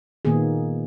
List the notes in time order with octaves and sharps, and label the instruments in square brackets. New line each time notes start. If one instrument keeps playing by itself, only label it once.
[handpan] A#2 D#3 A#3 B3 G#4